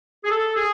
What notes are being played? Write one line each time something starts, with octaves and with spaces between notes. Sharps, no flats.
G#4
A4
G#4